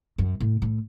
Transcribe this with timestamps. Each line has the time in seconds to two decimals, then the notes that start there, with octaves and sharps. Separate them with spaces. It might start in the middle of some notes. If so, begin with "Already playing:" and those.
0.18 F#2
0.40 A2
0.62 A2